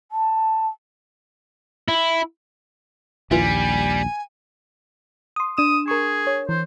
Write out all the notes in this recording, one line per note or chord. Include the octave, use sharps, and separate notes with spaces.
A5
E4
A#1 D#2 G3 E4 F4 B4 G#5
C6 D#6
D4 D#6 E7
G#4 A#4 C#6
C#5
E3 C5